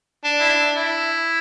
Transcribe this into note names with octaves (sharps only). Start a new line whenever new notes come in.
D4
E4
D4
E4